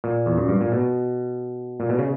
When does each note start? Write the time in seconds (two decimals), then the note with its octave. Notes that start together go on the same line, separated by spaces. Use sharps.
0.04 A#2
0.26 E2
0.37 F#2
0.48 G2
0.61 A#2
0.72 B2
1.80 A#2
1.89 B2
1.99 C#3